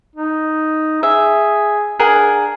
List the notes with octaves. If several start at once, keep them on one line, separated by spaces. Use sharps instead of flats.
D#4
G#4 E5
D4 G#4 A#4 F#5